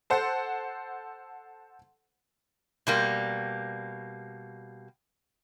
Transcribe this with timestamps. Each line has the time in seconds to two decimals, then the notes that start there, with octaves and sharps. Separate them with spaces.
0.10 A4 C5 F#5
2.87 B2 G3 A#3